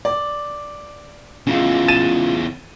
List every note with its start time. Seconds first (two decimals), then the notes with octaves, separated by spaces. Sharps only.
0.05 D5
1.47 E2 C#3 C#4 F4 F5
1.88 A6 D#7 E7